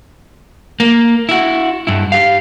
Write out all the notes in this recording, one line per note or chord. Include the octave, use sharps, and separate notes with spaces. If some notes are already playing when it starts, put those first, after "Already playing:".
A#3
E4 F#4
G2 E4
G4 F5